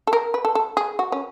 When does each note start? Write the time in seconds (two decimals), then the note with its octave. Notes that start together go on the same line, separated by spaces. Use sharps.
0.07 A4
0.13 A#4
0.34 B4
0.45 A4
0.55 A4
0.77 G#4
0.99 F#4
1.12 C#4